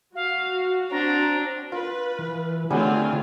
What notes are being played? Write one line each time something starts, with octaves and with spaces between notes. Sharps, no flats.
F#4 F5
C4 D4 A#5
F4 B4
E3
D3 F#3 G3 A3 C4 F4 G#4 G#5